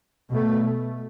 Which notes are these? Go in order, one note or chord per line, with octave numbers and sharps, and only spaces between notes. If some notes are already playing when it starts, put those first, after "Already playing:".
B2 A3